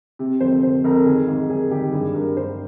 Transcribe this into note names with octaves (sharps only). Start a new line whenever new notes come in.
C3
F2 C5
C3 C5
F2 A#4
D#3 G#4
G#2 G#4
D#3 G#4
D#3 G4
G2 G#4
G2 A#4
G2 C5